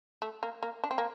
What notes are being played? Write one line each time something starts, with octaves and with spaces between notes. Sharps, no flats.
A3
A#3
A#3
D4
C4
A#3